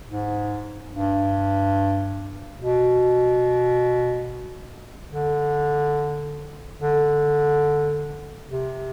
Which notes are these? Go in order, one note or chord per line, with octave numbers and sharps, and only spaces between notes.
G#2
G2
B2
D3
D3
C3